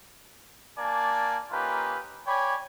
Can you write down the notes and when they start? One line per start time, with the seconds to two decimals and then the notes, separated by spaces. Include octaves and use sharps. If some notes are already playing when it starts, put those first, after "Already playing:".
0.78 A#3 D4 D5 G#5 A5
1.50 A#3 C#4 D#4 F4 G4 B4
2.27 C#5 D5 G5 G#5 B5